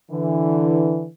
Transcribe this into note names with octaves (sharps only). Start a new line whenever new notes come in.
D3 E3